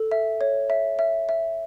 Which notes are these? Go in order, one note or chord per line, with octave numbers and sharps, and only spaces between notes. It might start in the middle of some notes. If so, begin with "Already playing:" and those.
Already playing: A4
E5
C#5
E5
E5
E5